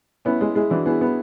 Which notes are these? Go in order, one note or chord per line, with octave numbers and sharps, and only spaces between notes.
B3 C#4 E4
G#3 E4 G#4
G#3 E4 G#4
E3 D4 F#4
B3 E4 G#4
B3